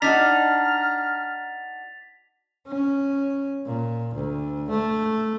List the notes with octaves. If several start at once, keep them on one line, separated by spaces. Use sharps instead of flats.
D4 D#4 F#4 A#5 F6 A6 B6 F7
C#4
A#2
D2
A3